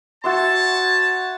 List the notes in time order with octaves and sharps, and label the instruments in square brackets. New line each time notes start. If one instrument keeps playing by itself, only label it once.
[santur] F#4 E5 C6 [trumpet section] C#5 A5